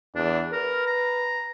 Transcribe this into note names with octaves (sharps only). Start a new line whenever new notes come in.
E2 D4
A#4 B4
A#5